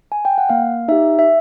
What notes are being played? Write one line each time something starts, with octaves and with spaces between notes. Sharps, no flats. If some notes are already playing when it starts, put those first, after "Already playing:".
G#5
G5
F#5
A#3 F5
D#4 G4 E5
E5